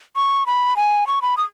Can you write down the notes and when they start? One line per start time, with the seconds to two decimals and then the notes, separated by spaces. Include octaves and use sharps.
0.16 C#6
0.46 B5
0.76 G#5
1.07 C#6
1.22 B5
1.37 D#6